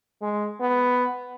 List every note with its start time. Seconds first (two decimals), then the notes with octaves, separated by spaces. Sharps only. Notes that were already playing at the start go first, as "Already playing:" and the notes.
0.22 G#3
0.60 B3